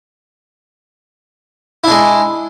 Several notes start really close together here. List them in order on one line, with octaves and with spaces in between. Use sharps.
E4 D4 G#3